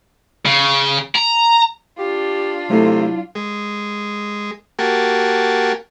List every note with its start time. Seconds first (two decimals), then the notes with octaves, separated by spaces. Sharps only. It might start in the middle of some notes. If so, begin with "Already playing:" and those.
0.46 C#3
1.16 A#5
1.98 D4 F4 G4
2.70 C3 F#3 A3 E4
3.35 G#3
4.79 A#3 F#4 G4 G#5 A5